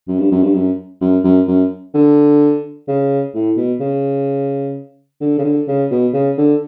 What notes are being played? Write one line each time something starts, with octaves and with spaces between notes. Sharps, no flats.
F#2
G2
F#2
G2
F#2
F#2
F#2
F#2
D3
C#3
A2
B2
C#3
D3
C#3
D3
C#3
B2
C#3
D3